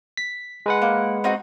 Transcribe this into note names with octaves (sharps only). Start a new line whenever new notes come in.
B6
G#3 B4 F#5
A#3
C4 D#4 F#4